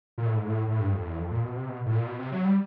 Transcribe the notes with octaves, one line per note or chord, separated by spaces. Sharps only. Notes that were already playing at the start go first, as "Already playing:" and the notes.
A#2
A2
G#2
A2
A2
G2
F2
E2
F2
A#2
B2
C3
B2
A2
A#2
B2
C3
F#3
G3